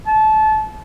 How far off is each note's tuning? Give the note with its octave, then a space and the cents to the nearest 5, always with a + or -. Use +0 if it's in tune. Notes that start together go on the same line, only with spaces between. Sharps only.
A5 -25